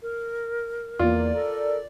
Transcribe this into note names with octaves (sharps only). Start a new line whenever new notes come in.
A#4
E2 A#3 F4 D5
A4 A#4